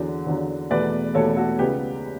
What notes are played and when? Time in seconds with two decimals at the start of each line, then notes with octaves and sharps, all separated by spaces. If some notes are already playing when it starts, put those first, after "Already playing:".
Already playing: E2 D3 F#3
0.26 E2 D3 F#3
0.70 E2 B2 A3 B4 D5
1.14 E2 B2 A3 A4 C#5
1.36 F#4 A4
1.59 C#2 C#3 G3 B3 G4 B4